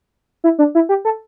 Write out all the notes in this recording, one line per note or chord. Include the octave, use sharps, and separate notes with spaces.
E4
D4
E4
G4
A4